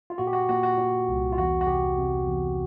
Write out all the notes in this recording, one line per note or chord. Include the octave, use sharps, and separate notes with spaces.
F4
A#2 F#4
G4
F#4
A#2 F#4
F#4
A#2
C2
F4
E2 F#4
F#4
C3 G4
C3
E2